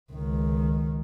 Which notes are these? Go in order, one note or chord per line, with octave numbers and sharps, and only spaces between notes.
C#2 D#3